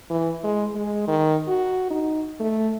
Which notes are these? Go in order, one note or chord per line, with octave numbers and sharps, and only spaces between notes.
E3
G#3
G#3
D#3
F#4
D#4
A3